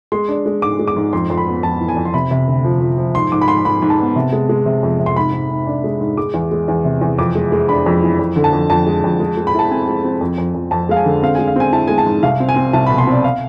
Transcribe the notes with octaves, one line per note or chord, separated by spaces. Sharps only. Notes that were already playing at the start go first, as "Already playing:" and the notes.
G#3 C6
D4
G#3
G#2 D6
G#3
D6
G#2
F2 C6
F2 C6
B5
B3
F2 A5
E3
G#5
F2
C6
C3 B5
C3
D2
F3
F3
F3
G#2 C6
G#2 D6
B5
G#2 C6
G#2 B5
G#2
A5
B3
C3
G#3
G#3
C3
F2
C3
C6
G#2 B5
G#2
G#2
D4
G#3
G#2
G#3 D6
E2
G#3
E2
C3
E2
F2 D6
G#3
G#3
D4 B5
F2
E3
F2
D3
A5
F2
F2 A5
G#3
F2
G#3
G#3
B5
E4 A5
C4 G#5
G#3
C4
F2
F2
F2
F2 A5
G#3 F5
G#5
D3
C4 F5
G#3 G#5
F5
C4 G#5
E4 A5
G#3 G#5
A5
G#2
C2 F5
C4
G#5
C4
C2 A5
B2 B5
C6
C4 D5
F5